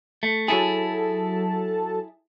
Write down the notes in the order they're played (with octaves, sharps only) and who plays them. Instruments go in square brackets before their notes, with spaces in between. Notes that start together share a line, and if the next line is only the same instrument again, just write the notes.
[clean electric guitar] A3
[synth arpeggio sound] F#3 A4 A5 [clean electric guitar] E4 G#4